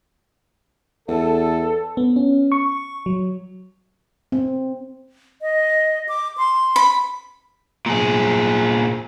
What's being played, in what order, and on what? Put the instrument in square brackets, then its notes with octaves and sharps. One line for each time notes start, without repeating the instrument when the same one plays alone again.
[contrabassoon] E2 [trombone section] A4
[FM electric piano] B3
C#4
C#6
F#3
[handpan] C4
[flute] D#5
D6
C6
[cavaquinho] B5
[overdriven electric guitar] A#2 G#4